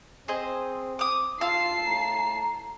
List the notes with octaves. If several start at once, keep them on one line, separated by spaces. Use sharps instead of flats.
C4 G#4 C5 D#5
D6 D#6
F4 F5 A5 E6 C7
A2 A#5